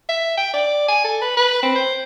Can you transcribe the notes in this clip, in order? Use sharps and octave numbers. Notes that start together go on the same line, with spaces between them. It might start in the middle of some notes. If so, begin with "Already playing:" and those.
E5
G5
D5
G#5
A4
B4
B4
C4
C5